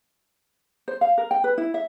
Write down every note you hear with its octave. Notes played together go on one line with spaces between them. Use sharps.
C5
F5
A#4
G5
B4
E4
E5